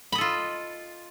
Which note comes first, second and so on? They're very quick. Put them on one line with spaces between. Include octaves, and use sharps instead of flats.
B5 D#5 A4 F4